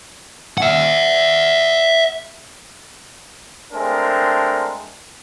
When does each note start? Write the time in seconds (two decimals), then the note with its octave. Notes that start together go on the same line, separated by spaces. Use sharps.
0.58 E5 F#5
3.73 G#3 A3 C4 D4 A#4